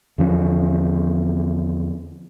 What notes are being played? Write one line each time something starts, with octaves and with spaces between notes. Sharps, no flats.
E2 D3 F3 C#4